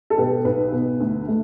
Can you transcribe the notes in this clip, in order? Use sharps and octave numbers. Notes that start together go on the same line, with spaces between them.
A4
B2 B3 G4
B1 B4
B2 B3
D2
D3 A3